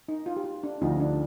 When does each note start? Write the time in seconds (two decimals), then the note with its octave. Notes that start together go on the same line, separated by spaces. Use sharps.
0.08 D#4
0.26 F4
0.36 G4
0.44 F4
0.64 D4
0.81 D2 D3 F3 D#4
1.00 D4